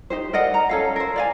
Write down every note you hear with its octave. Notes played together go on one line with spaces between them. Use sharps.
D#4 G4 C5
A#4 D5 D#5 F#5
A#5
C#4 A4 F5
A#4 C5
D5 F5 G#5